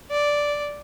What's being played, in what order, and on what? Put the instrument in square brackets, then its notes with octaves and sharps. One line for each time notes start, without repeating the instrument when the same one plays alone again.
[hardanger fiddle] D5